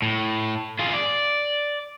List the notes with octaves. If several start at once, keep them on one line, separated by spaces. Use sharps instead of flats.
A2
F4 G#4
D5